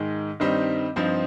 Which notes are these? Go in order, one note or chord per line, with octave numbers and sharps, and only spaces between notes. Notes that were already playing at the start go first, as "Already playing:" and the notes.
Already playing: G#2 D#3 G#3
G2 D#3 G3 C4 D#4
G2 F3 C4 D#4